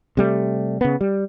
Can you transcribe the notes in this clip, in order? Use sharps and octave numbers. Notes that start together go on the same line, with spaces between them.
C3 G3 A3
C#3 B3
G3